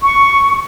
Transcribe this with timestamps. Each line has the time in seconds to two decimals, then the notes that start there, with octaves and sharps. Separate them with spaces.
0.03 C#6